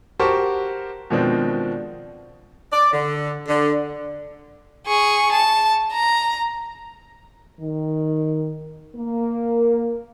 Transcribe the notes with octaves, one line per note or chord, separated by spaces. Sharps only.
F#4 G4 A#4 C5 A5 C#6
B2 D#3 F3 G#3 C4 D4
D5
D3
D3
G#4 C#6
A5
A#5
D#3
A#3